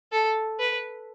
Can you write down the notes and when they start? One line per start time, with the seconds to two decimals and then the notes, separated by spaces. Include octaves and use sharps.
0.12 A4
0.60 B4